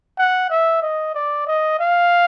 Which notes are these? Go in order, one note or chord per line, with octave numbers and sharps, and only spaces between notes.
F#5
E5
D#5
D5
D#5
F5